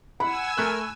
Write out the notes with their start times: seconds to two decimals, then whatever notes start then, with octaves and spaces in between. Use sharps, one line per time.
0.20 F#5 G#5 B5 E6
0.58 A3 A#4 F6 F#6